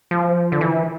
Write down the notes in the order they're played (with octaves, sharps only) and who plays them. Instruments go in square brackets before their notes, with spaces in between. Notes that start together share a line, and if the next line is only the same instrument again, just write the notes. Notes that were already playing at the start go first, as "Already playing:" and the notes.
[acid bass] F3
D3
E3